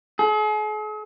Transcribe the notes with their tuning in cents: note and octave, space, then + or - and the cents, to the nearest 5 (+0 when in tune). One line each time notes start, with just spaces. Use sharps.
G#4 +45